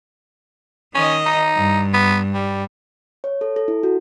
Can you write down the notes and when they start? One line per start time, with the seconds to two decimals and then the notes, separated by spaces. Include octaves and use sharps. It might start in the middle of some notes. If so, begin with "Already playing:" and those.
0.95 D#3 C#4 D#5
1.26 D#4
1.57 G2
1.93 B3
2.34 G3
3.24 C#5
3.41 A4
3.56 A4
3.68 E4
3.83 F#4